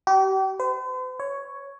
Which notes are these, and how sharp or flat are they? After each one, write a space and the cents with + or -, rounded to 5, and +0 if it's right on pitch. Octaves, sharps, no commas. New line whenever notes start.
G4 -35
C5 -45
C#5 +5